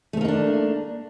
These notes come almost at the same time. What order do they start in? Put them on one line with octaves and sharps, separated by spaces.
A3 C4 A#3 D#4 D4